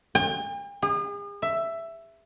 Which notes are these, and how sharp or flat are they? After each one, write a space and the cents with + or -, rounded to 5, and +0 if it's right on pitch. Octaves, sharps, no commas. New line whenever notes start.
G5 +45
G#4 -40
E5 +10